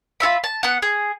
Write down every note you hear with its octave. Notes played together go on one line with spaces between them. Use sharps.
F4 F#4 E5 B5
A5
B3 F#5
G#4